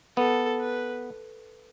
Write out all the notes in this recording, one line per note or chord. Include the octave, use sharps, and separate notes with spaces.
B3 A4
B4